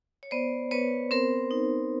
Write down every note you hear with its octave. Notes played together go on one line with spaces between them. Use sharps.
C#5
B3 C5 D5
B3 B4 C#5
C4 A#4 C5
D#4